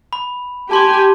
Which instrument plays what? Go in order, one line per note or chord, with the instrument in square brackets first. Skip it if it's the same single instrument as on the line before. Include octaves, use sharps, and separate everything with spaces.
[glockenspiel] B5
[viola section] G4 G#5 [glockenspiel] A5 C6 D6